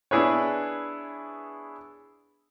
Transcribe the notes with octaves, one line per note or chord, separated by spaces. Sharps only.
B3 D4 E4 G#4 B4 C#5